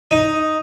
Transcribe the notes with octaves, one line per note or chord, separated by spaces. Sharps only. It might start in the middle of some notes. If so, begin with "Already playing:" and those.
D#4